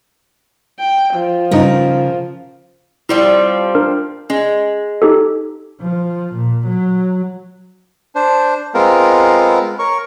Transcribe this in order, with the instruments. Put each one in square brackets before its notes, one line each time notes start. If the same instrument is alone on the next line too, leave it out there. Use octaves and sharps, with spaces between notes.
[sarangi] G5
F3
[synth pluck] G2 D#4 [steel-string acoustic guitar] C#3 A#4
[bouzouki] F3 G3 C4 [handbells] E4
[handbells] D4 A#4
[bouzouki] G#3 [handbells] C#4
[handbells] D#4 G4 A4
[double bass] F3
A#2
F#3
[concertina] D4 C5
G#3 B3 C4 F4 A#4
A#4 C#5 C#6